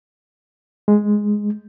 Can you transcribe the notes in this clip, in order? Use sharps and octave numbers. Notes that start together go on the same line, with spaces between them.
G#3